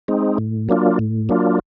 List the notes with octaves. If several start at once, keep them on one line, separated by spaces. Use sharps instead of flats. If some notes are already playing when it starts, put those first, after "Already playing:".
G#3 C4 D#4
A2
F#3 A#3 D4 F4
A2
F#3 A#3 D4 F4